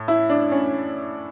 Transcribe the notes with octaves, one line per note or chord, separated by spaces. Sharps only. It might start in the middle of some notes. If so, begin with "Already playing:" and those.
Already playing: A2
E4
D4
C#4